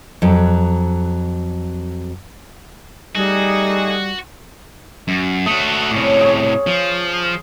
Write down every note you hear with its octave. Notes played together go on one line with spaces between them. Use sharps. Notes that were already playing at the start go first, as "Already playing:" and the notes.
F2 F#3
G3 A3 D#4 F#4 G#4
F#2
A3 F#4 D#5
A2 C3 C#4 D5
G#4 C#5
F3